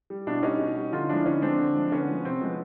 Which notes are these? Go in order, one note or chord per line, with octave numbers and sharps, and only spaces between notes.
G3
B2 D4 E4
G3 C#4 D#4
B2
G3
D3 D#4 F4
F3 G#3 D4 E4
D3 C#4 D#4
F3 G#3 C4 D4
D3
F3 G#3
D3 B3 C#4
F3 G#3
C3 C4
F3 G#3 B3